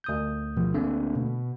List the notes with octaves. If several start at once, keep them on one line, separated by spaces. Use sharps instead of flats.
D2 D#6 G6
B2 F3
D2 D3 A3 A#3 C4 D4
B2